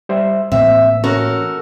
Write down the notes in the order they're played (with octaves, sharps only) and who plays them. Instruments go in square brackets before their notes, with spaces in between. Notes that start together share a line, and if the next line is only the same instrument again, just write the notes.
[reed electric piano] G3 C5 E5
[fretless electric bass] A2 E3 A#3 [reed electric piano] C4 [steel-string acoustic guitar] E5
[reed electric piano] C#4 [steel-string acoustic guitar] F#4 A4 A#4